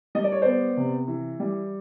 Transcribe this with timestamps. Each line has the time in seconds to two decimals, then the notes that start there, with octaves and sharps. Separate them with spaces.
0.15 G3 D#5
0.24 D5
0.32 C#5
0.42 B3 C5 D5
0.77 C3
1.08 E3
1.40 G3